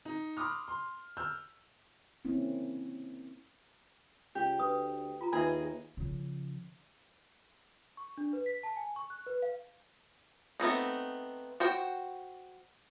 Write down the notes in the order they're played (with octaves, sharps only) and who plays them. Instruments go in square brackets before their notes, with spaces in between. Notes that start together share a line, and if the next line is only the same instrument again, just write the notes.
[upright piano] D#4
B5 C6 D6 D#6 F6
C6
E6 F6 G6
[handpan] A#3 C4 C#4 E4
[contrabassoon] C#2 [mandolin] G4
[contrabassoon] D2 [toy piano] B4 D#6
[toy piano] F4 A#5
[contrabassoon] D#2 [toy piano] F4 B4 E5 [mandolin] G#4 D#5
[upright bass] C#3 F3
[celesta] C#6
D4
B4
B6
A5
G#5
C#6
F#6
B4
F5
[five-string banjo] A3 B3 C4 D#4
F#4 C5 G5